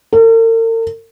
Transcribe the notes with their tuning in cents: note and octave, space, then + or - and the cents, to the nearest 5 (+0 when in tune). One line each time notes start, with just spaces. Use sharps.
A#4 -45